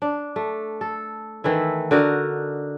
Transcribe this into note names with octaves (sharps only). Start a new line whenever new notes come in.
D4
A3
A4
D#3 E3 A3 E4
D3 F#4 A#4 D#5